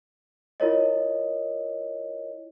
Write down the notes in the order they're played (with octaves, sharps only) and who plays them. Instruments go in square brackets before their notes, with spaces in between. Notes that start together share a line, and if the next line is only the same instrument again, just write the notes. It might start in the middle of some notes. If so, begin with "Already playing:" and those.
[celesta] E4 F4 A#4 C#5 D#5